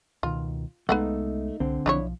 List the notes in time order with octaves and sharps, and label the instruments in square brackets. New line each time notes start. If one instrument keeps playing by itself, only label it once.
[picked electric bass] C#2 B2 D#3 [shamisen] F4
[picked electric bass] C2 G#3 B3 [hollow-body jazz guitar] A3 D#4 [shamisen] B4 F5 F#5
[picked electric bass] C2 [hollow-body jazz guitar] D3 C4
[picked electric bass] B1 F3 [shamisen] D4 E4 C#5